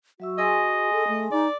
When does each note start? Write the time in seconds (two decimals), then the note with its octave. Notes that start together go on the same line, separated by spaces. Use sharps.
0.20 F#3 F#4 E5 E6
0.38 G#4 D#5 G#5 C6
0.93 A4
1.08 A3
1.32 D#4 D5